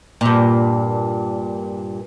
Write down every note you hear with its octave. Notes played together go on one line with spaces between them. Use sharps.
G2 A#2